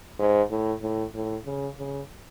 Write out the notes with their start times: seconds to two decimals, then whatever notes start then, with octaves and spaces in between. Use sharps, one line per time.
0.19 G#2
0.50 A2
0.81 A2
1.14 A2
1.45 C#3
1.78 C#3